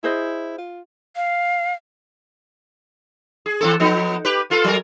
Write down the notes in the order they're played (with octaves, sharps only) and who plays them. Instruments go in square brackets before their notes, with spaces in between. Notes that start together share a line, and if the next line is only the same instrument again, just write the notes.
[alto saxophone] E4 [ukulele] G#4 C5 D#5
[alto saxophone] F4
[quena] F5
[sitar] G#4
E3 C4 A4
F3 B3 D#4
G4 B4
B3 F4 A4
F#3 A#4